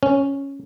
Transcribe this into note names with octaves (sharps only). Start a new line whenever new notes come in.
C#4